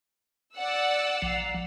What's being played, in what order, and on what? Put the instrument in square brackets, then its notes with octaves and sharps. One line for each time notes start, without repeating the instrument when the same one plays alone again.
[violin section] D5 F#5 E6
[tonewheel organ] A#1 F3